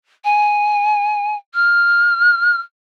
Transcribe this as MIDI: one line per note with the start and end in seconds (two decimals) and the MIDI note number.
0.24 1.35 80
1.54 2.60 89